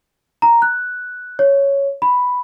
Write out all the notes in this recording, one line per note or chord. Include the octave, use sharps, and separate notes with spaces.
A#5
F#6
C#5
B5